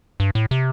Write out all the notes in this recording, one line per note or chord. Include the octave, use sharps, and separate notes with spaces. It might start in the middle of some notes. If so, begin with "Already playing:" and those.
G2
A2
C3